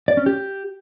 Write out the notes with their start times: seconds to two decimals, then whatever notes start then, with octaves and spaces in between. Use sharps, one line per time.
0.08 D5
0.17 C#4
0.26 G4